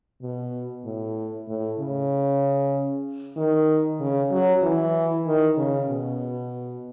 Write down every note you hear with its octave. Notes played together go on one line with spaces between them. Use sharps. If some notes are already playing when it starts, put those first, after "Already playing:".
B2
A2
A2
C#3
D#3
C#3
F#3
E3
D#3
C#3
B2